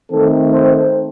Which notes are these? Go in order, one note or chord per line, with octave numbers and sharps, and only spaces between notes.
D#3 A3 C4 A4
C5